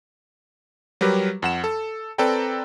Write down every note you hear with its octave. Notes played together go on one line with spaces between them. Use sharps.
F#3 G3 G4 A#4 B4
F2 F#5 E7
A4
C4 A4 B4 D5 G5 A#5